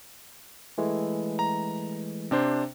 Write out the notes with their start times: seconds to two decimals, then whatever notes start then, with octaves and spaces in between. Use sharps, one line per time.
0.78 E3 G#3 A3
1.39 A#5
2.31 C3 D4 C5